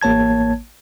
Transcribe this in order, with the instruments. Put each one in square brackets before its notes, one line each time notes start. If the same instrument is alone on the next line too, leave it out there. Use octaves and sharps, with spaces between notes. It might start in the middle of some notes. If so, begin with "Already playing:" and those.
[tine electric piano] A1 A#3 C#5 A5 G#6